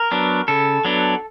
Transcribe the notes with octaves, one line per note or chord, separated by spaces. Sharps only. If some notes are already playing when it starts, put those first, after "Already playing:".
Already playing: A#4
F#3 B3 D4
C#3 A4
F#3 B3 D4